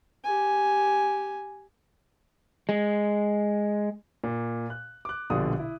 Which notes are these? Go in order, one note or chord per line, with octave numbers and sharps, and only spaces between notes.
G4 G#5
G#3
A#2
F#6
D6 F#6
A#1 B2 D3 F4 G4 D#6
E4